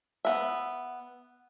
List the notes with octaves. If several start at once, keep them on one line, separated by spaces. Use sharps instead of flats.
B3 E5